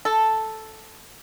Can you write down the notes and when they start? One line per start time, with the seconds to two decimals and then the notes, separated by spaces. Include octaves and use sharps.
0.05 A4